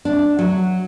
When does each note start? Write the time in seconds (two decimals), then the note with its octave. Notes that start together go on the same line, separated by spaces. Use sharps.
0.05 D4
0.39 F#3